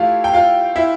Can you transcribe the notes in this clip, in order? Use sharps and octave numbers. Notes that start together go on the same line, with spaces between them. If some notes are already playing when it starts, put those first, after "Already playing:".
Already playing: E3 A3 E4 F4 G4 F5
G5
F4 F5
E4 E5